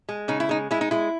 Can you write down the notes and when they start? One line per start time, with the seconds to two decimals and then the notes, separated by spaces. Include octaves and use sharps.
0.09 G#3
0.28 C#3 D#4
0.40 E4
0.49 G#3 D#4
0.71 G#3 E4
0.81 D#4
0.91 G#3 E4